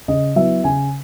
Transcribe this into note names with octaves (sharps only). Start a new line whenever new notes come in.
C#3 D#5
F#3 B3 E4 E5
C#3 G#5